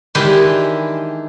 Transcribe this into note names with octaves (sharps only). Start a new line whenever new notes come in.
D#3 E3 G#3 D4 E4 G4